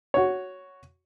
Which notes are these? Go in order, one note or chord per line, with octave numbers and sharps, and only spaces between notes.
F#4 C#5